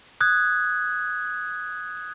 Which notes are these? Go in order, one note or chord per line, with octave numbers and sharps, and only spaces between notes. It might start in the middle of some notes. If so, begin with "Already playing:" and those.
D#6 F#6 G#6